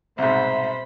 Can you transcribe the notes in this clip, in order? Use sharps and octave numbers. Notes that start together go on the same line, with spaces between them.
C2 G#2 B2 C5 E5 B5